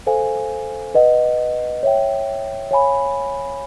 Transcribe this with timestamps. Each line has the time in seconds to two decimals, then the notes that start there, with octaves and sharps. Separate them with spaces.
0.07 A4 C5 F5 G#5
0.95 B4 D#5 F#5
1.83 C#5 E5 G5
2.71 C#5 F5 G#5 B5